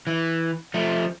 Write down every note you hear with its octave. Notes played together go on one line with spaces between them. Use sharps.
E3
F3 A3